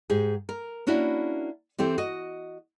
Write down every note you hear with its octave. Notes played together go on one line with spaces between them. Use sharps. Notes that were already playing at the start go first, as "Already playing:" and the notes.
G#2 G4 G#4
A#4
A#3 C#4 D4 E4 F#4
E3 C4 G4 A4
F#4 D#5